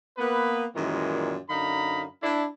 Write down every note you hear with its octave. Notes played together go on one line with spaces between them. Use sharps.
A#3 B3 B4
F#2 A#2 D#3 E3 G3 G#3
F#2 D3 D#4 F5 A#5 B5
D4 E4